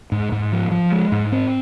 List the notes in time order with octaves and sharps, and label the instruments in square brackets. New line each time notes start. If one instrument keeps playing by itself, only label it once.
[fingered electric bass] G#2
G#2
F3
F3
G#3
G#2
C4